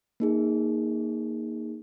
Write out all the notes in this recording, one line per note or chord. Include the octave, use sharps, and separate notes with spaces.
A#3 D#4 G#4